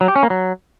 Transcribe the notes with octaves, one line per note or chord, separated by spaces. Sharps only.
F#3
G4
C#4
A#3
F#3